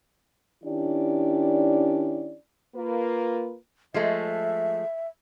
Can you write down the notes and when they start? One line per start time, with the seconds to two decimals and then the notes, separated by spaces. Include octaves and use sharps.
0.64 D#3 C#4 D4 E4 G4 D5
2.76 A#3 F4 B4
3.94 F3 G#3 A3 E5